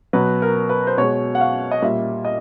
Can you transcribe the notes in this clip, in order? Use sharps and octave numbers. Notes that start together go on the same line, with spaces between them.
B2 F#3 B4
A#4
B4
C5
B2 G#3 C#5
F#5
F5
D#5
A#2 G3 E5
D#5